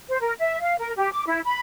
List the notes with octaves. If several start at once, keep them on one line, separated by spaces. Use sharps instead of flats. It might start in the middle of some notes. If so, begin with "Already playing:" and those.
C5
A#4
E5
F5
A#4
G4
D6
E4
B5